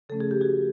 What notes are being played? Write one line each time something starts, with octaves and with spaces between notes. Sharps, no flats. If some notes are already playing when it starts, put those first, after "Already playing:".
C#3 F3 A3 C#4 A4
G#4
G4
F#4 G#4